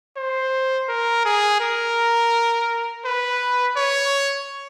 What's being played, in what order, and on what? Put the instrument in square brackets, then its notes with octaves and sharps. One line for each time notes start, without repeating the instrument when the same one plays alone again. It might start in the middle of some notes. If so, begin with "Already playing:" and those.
[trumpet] C5
A#4
G#4
A#4
B4
C#5